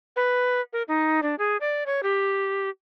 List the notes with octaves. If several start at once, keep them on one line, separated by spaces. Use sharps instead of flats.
B4
A#4
D#4
D4
G#4
D5
C#5
G4